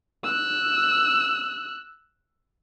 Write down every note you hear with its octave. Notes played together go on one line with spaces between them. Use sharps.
E6 F#6